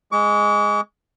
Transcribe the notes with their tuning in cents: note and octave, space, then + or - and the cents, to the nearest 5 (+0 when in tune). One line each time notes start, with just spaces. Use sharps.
G#3 +0 C#6 +45